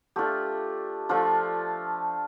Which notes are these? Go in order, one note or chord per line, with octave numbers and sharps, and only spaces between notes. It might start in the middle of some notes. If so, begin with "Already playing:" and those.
A3 D4 F4 G4
F3 A3 D4 F4